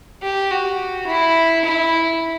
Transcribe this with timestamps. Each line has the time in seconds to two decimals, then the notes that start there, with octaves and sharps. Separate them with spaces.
0.23 G4
0.51 F#4
1.07 E4
1.64 E4